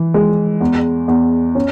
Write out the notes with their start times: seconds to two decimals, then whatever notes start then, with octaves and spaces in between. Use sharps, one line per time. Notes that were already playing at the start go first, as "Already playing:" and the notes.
Already playing: E3
0.14 G#3
0.61 E2
1.08 E2
1.55 C#4